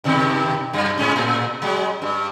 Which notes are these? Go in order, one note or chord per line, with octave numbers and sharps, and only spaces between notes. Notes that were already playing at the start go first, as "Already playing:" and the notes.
G2 B2 D#3
F#2
G#2 G#3 C#4
A2
F#3 G#3
G2